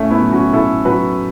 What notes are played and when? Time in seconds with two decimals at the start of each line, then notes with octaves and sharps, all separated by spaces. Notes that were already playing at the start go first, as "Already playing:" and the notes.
Already playing: A2 A3 C#4
0.10 B3 E4
0.21 F#3
0.32 C#4 F#4
0.53 A2 E4 A4
0.85 F#3 F#4 B4